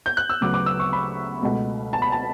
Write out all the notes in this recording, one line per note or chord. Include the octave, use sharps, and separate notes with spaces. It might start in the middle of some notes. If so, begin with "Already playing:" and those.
G6
F#6
E6
D2 C#3 F#3 B3 D6
D6
E6
C#6
B5
C#2 B2 A3
A5
B5
A5